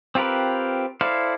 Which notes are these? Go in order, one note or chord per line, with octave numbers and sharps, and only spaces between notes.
C4 F4 G4 A#4 B4
E4 A4 C5 D5 F5